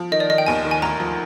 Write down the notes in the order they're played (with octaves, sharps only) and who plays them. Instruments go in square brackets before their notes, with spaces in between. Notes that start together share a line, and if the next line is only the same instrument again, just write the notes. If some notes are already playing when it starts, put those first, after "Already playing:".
Already playing: [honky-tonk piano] F3
[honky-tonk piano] D#3 [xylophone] D#5
[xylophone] D5
[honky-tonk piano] D#3 [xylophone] D#5
[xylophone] G5
[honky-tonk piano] D#2 [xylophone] G#5
[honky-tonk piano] D#3
[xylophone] G#5
[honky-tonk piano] D2 [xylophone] A#5
[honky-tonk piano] F3